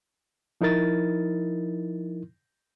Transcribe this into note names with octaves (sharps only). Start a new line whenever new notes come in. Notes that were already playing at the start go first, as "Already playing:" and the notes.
F3 D#4 E4 A#4 A6